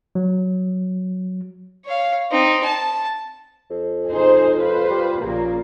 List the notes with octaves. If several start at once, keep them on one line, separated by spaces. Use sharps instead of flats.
F#3
C#5 F5
C4 D#4
A5
F2
D#4 G#4 C5
F4 B4 C5
G3
A#1 A#2 C#3 A#3